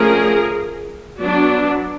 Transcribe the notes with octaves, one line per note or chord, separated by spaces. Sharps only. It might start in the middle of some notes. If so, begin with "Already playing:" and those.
Already playing: D3 F3 A3 C#4 G#4 A#4
F#3 B3 D4